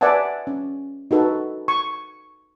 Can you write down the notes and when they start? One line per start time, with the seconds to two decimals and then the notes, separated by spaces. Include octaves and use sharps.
0.01 B4 D5 E5 F#5 G#5 A5
0.47 C#4
1.11 D#4 F#4 A4 B4
1.68 C#6